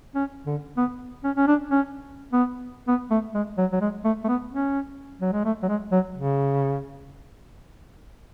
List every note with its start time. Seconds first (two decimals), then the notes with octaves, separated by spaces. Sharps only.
0.15 C#4
0.46 D3
0.77 B3
1.24 C#4
1.36 C#4
1.47 D4
1.71 C#4
2.33 B3
2.88 B3
3.11 A3
3.35 G#3
3.58 F#3
3.73 F#3
3.81 G#3
4.05 A3
4.24 A3
4.28 B3
4.52 C#4
5.21 F#3
5.33 G#3
5.45 A3
5.63 F#3
5.69 G#3
5.92 F#3
6.15 C#3